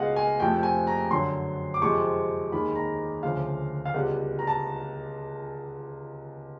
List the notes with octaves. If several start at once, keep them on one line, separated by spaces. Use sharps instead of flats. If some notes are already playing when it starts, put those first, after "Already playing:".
Already playing: C#2 B2 G#3 D#5 F5 F#5
G#5
F2 C3 F3 A3 G5
G#5
A#5
F#2 D3 F#3 C6
D6
F2 C3 F3 G#3 C#6
D#2 D#3 G#3 B5
A#5
D2 C#3 F3 F5
F5
C#2 B2 G3 F#5
A#5
A5